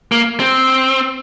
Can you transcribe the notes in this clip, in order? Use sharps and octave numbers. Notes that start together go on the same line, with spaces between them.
A#3
C4